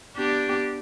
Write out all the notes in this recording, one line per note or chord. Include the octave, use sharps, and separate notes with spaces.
B3 D4 G4